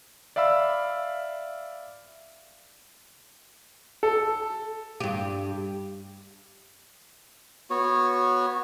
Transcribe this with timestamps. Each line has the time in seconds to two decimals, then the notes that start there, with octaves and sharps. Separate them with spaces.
0.36 D5 E5 F5 B5 E6
4.03 A4
5.00 G2 G4
7.70 B3 F#4 C#5